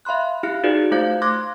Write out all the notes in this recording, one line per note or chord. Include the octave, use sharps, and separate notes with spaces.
E5 F5 B5 C6 F#6
E4 G4 F5 F6 F#6 C#7
D#4 F4 F#4 G#4 B4 D5
A3 F4 C5 F5 G6 G#6
C6 D6 F6 F#6 G#6 A#6